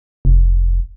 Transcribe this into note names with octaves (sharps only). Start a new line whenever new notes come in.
F1